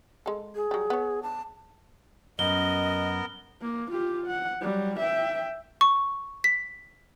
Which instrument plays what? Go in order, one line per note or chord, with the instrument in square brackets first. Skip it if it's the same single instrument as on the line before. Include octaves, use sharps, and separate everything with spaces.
[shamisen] G#3 A4
[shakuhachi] G#4
[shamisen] F#3 G3
B3 C#5
[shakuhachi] A5
[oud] F#2 [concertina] B3 A#4 [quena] D#5 [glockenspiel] G7
[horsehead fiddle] A#3
F4 G4
F#5
F#3 G3
E5 G5
[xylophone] C#6
B6